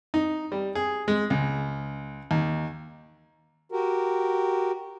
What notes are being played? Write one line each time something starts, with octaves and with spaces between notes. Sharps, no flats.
D#4
G3
G#4
G#3
C#2
D#2
F#4 G4 A#4